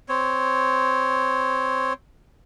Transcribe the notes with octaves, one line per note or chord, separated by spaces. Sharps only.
C4 C#5